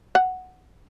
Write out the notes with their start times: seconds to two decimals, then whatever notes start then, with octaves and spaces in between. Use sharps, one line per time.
0.15 F#5